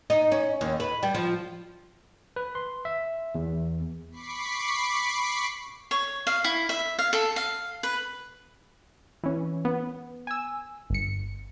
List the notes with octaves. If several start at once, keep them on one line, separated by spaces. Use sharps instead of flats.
D#4
C#4
D#2
B4
G3
F3
B4
C6
E5
E2
B5 C#6 D6 B6 C7
C#5
F5
E4
E5
F5
A4
F5
B4
E3 C#4
B3
G#5 E6
G1 C#7